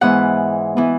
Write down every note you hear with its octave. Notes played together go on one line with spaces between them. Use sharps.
G#2 E3 B3 F#5
E3 B3